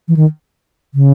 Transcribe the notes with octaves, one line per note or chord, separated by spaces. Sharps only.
E3
D#3
C#3